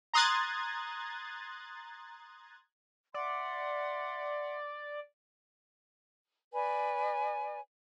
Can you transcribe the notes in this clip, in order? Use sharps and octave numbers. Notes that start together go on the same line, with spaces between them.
A#5 C6 D#6 F#6 G#6 A6
D5 E5 F#5 C6
B4 D5 G#5